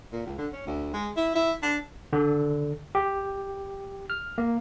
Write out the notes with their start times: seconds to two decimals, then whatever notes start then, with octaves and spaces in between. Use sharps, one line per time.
0.13 A#2
0.26 C#2
0.38 D3
0.53 C#4
0.67 D2
0.94 G#3
1.17 E4
1.36 E4
1.63 D4
2.13 D3
2.95 G4
4.10 F6
4.38 A#3